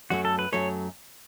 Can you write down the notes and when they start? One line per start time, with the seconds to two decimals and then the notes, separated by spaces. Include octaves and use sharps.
0.10 F#2 F#3 A3 F#4
0.25 A4
0.39 B4
0.52 F#2 F#3 A3 C#5